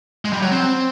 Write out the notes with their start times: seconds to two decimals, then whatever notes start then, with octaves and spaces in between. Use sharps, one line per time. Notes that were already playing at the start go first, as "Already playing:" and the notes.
0.25 G#3
0.33 G3
0.42 F#3
0.52 C4